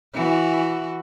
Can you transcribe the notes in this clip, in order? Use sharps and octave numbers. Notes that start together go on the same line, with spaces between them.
E3 F#4